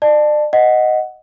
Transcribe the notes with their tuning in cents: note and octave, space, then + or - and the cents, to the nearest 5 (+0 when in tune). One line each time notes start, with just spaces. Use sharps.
D5 +35 A5 -5
D#5 +0 F#5 +0